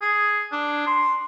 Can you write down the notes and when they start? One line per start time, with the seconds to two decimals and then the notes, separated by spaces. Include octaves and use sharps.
0.01 G#4
0.52 D4
0.86 C6